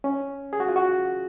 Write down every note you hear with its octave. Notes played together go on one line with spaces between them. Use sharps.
C#4
G#4
F#4
F4
F#4